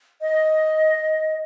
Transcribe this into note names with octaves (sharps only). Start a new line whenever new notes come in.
D#5